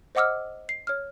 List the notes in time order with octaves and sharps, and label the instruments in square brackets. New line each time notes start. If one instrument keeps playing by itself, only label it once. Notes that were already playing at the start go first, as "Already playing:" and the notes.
[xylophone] C5 D#5 F#5 D6 E6 F6
C7
C#5 F6